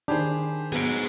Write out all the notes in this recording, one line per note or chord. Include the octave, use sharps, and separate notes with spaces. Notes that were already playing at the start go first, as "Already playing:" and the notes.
D#3 D4 G4 G#4 C5 B5
F#3 B3 G#4 C5 D7